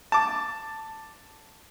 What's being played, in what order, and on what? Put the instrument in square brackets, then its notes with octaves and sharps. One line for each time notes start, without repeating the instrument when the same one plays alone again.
[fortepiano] A5 D6